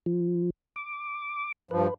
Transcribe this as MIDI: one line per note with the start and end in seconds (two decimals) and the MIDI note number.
0.06 0.50 53
0.76 1.52 86
1.71 1.87 43
1.71 1.87 53
1.71 1.94 71